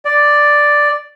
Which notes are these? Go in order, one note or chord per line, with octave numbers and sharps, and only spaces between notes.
D5